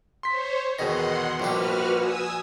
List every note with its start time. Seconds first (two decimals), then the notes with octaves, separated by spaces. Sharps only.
0.23 C5 C#5 C6 B6
0.79 E2 B2 D#3 G#4 F#5 C6 A#6
1.40 A#1 F3 G3 F#4 G4 B4 F6
1.95 G#5 D#6 E6